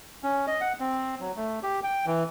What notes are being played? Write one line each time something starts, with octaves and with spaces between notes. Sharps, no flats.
C#4
D#5
F#5
C4
F#3
A3
G4
G5
E3